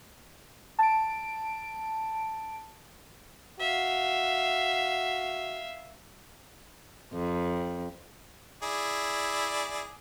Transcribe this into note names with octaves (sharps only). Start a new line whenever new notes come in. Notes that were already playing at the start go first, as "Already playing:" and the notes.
A5 D7
F#4 E5 F5
F2
E4 G#4 D5